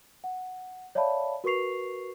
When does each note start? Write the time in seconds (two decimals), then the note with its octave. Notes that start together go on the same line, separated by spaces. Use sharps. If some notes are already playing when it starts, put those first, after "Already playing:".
0.24 F#5
0.95 C#5 D5 E5 F5 A5 B5
1.44 F#4 A#4 B4 C#6 C7 F7